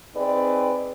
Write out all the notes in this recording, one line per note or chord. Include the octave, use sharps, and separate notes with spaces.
C4 D#4 G#4 B4 D5